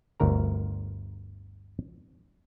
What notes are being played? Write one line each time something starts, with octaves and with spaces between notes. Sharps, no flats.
G1 D2 A#4 A#5